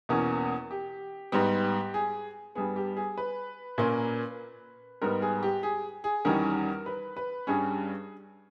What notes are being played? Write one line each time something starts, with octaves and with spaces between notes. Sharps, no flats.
E2 B2 A#3 C#4
G4
G#2 G3 B3 G4
G#4
G2 G3 B3 G#4
G4
G#4
B4
A#2 A#3 C#4
G#2 G3 B3 A#4
G#4
G4
G#4
G#4
E2 D#3 G3 C#4 A#4
B4
B4
G2 G3 C#4 G#4